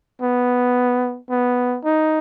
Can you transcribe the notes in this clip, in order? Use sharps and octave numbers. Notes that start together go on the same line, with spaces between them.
B3
B3
D#4